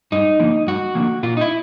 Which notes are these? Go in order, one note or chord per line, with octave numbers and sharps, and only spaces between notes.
G2 D#4
D3 F3 A#3
G2 F#4
D3 F3 A#3
A#2 F4
D#4
E4